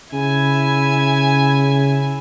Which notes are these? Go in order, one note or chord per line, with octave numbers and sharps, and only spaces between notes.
C#3 E4 G#5